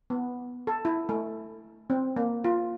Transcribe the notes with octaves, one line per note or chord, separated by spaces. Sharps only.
B3
A4
E4
A3
C4
A#3
F4